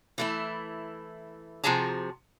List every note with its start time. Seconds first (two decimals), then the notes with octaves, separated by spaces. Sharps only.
0.18 E3 A3 E4
1.64 C3 F3 F#4 G#4 A5 A#5